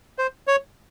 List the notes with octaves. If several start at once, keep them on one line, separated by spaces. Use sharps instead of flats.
C5
C#5